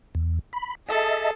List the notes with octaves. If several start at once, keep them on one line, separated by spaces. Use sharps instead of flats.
E2
B5
G#4 A4 D#5 E5 A5